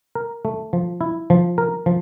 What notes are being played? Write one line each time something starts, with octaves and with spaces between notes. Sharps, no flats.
A#4
A3
F3
E4
F3
A#4
F3